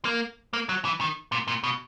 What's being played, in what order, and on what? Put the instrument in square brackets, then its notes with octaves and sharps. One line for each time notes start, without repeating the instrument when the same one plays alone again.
[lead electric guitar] A#3
A#3
F#3
E3
D#3
A#2
A#2
B2